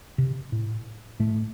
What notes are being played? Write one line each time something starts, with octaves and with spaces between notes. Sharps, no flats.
C3
A2
A2 A3